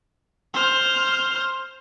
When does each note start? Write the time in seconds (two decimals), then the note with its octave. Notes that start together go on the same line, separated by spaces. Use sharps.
0.54 C5 F6